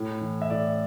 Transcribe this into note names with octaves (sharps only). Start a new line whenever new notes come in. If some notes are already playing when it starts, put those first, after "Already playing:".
Already playing: A2
E3
E5
A2 D5